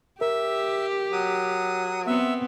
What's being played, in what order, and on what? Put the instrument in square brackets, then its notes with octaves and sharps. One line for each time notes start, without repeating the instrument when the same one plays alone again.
[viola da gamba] G4 [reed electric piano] A#4 [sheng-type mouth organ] E5
[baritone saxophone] F#3 [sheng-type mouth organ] D#6
[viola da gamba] B3 C4 [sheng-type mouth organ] E5